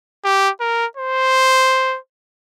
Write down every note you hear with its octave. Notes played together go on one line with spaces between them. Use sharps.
G4
A#4
C5